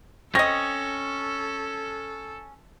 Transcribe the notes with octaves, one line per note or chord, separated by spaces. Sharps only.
C4 C#4 A4 D#5 A#6